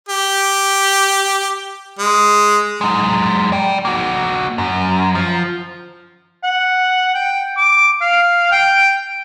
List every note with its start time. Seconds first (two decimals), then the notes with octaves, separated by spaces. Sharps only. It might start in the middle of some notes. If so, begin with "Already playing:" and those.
0.09 G4
1.99 G#3
2.81 F#3 G#3
3.52 D5 G5
3.85 A#3 F#4
4.58 F#2
5.15 F3
6.43 F#5
7.15 G5
7.57 D6
8.01 F5
8.52 G5